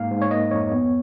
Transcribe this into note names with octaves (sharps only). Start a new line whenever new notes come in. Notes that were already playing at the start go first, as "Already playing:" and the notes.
Already playing: G#2 A#3 F5
G#2
C#5
A#3 D#5
F2 C#5
B3